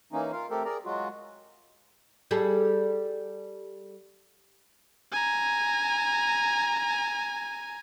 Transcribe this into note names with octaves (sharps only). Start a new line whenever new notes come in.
E3 A#3 C#4 D#4
F4 A#4 F5
A3 C4 G4 A4 A#4
G#4 A#4 D5 A#5
F#3 G#3 F4 F#4
G3 G#4 A4
G#5 A#5